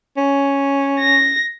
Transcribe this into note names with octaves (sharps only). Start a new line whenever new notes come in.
C#4
A#6